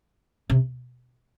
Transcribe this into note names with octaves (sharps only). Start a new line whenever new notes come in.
C3